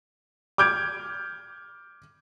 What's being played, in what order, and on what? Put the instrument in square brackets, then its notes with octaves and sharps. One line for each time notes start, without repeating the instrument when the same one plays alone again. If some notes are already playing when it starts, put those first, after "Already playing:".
[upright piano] D6 F6 G6 G#6 D7